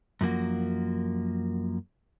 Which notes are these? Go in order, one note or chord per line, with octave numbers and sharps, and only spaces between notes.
F#2 F3 A#3 F#4